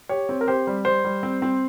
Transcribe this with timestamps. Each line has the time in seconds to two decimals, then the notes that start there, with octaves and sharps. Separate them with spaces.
0.09 G4 C#5
0.29 C4
0.41 A#4
0.47 G4 C5
0.67 G3
0.85 G3 C5
1.04 G3
1.23 C4
1.42 C4